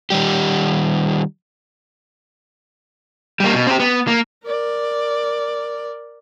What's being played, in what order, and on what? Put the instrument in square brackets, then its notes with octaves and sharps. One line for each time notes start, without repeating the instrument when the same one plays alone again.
[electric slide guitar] D#3 G3 G4
[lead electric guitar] G3 A#3
B2
C4 G4
B3
A#3
[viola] A#4 D5